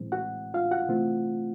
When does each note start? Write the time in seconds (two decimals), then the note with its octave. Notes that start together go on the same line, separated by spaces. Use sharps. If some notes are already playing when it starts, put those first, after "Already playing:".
Already playing: A2 E3 G#3 C4
0.12 F#4 F#5
0.54 F4 F5
0.71 F#4 F#5
0.88 C3 E3 A3 C4 F4